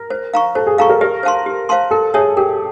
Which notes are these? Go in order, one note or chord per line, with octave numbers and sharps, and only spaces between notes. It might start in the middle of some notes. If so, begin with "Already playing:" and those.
Already playing: A#4
C5
F5 A#5 C#6
A4 C5
G#4
A4 F5 A#5 C#6
A#4
G4 A#4
C5 F5 A5 C6
G4
C5 F5 A5 C6
A4 A#4
G#4 C#5 E5 A5
G4 A#4